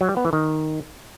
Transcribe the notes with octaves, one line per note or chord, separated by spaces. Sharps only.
F#3
G3
B3
E3
D#3